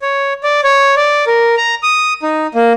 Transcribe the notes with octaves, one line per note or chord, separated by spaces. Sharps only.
C#5
D5
C#5
D5
A#4
A#5
D#6
D#4
A#3